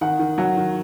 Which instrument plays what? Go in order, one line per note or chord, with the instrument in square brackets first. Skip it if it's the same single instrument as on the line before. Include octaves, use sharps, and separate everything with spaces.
[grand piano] D#3 [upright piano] F#5
[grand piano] D#3
[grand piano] F#3 [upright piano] F#5
[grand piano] D#3